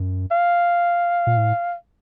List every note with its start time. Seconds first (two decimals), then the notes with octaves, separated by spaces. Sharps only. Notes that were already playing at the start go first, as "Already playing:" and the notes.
Already playing: F#2
0.31 F5
1.27 A#2
1.37 A2